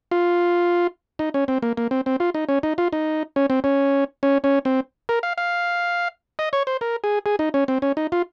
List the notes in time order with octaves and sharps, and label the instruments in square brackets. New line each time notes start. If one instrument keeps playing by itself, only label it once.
[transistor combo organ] F4
D#4
C#4
C4
A#3
A#3
C4
C4
F4
D#4
C#4
D#4
F4
D#4
C#4
C4
C#4
C#4
C#4
C4
A#4
F5
F5
D#5
C#5
C5
A#4
G#4
G#4
D#4
C#4
C4
C#4
D#4
F4